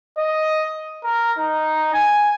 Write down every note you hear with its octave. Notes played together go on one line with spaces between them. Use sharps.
D#5
A#4
D#4
G#5